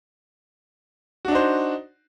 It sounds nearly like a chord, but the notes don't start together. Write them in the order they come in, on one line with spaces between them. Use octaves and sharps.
F#4 D4 D#4 C5